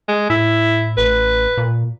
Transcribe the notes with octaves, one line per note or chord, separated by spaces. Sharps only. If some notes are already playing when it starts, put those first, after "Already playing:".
G#3
A2 E4
A1 B4
A#2